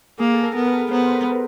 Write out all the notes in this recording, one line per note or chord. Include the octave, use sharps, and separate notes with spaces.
A#3 G#4
A4
A#4
B3
B4
B3 C5
B4